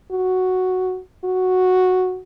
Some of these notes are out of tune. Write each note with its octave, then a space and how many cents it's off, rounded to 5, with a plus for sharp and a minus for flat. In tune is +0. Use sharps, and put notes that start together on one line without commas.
F#4 +0
F#4 -5